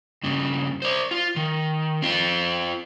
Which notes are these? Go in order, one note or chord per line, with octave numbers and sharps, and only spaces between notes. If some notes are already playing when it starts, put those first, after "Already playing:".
G2 C#3
C5 D5
F4
D#3
C4 F4